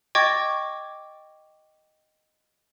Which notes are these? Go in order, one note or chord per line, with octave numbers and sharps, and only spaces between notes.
D#5 G5 C#6 D6 G#6 A6